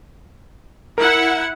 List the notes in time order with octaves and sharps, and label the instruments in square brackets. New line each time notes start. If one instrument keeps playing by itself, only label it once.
[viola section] E4 F#5 [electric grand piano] A#4